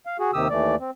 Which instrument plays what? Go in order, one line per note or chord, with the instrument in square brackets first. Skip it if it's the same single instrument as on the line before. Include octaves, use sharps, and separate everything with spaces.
[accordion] F5
F#4 G#4
D#2 C3 D#3 G4 D#6 E6
D#2 E3 A3 D5
C4